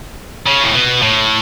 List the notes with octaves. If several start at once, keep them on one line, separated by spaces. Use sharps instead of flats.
C#3
A2
B2
A2